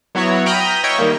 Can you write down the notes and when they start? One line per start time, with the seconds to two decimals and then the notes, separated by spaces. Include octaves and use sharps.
0.15 F#3 B3 E4 F#4 C#5
0.46 G5 A#5 B5 D#6 F6 G6
0.84 C#5 D#5 E5 G5 C#6
0.99 D#3 G3 A#3